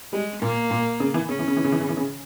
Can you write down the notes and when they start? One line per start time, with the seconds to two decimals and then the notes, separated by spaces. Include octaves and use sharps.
0.13 G3 G#3
0.42 A#2 A#3
0.71 A#2
1.00 C#3
1.14 E3
1.29 C#3 C#4
1.39 E3
1.48 C#3
1.57 E3
1.64 C#3
1.72 E3
1.81 C#3
1.89 E3
1.97 C#3